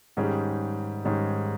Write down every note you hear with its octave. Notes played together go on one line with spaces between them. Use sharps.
G#2 D#3 G3 C#4 G#4
G#2 D#3 G3 C#4 G#4